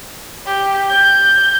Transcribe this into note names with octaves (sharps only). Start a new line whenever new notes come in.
G4
G6